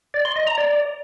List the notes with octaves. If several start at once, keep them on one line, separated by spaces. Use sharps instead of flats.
D5
C6
D#5
A#5
D5